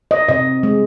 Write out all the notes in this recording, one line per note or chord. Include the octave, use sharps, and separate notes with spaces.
D#5
C3 D#5
G#3